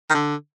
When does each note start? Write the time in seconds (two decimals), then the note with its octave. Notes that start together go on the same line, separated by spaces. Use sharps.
0.10 D#3
0.15 D3